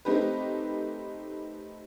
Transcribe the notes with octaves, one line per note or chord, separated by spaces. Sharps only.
A3 C4 D#4 G4 B4